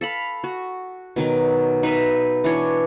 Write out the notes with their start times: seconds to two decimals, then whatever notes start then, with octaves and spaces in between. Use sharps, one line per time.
0.01 A4 F5 B5
0.44 F#4
1.16 B2 D#3 F#3
1.83 D#4 B4 D#5 E5
2.44 E3 D4 C#5